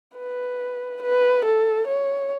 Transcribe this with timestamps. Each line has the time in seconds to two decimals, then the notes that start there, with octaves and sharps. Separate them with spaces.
0.17 B4
1.02 B4
1.45 A4
1.87 C#5